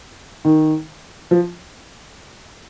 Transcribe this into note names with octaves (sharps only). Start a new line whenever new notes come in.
D#3
F3